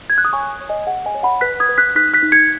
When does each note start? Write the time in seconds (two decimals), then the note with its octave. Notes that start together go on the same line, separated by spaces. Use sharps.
0.10 G#6
0.18 F#6
0.25 D#6
0.33 C#5 G#5 C#6
0.61 C#5
0.69 D#5 G#5
0.87 G#4 F#5
1.06 D#5 G#5
1.15 C#5
1.23 F#5 B5
1.41 B4 F#6 B6
1.60 D#6 G#6
1.69 B4
1.78 F#6 B6
1.95 D#4 F#6 B6
2.14 F#6 B6
2.23 D#4
2.32 G#6 C#7